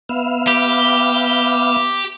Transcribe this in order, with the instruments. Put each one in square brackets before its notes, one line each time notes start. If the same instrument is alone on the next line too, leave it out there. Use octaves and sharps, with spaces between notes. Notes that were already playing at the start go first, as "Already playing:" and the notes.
[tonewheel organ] B3 E5 F5
[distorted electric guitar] G4